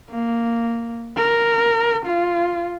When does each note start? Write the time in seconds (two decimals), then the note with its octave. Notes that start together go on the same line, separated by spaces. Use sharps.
0.10 A#3
1.17 A#4
2.06 F4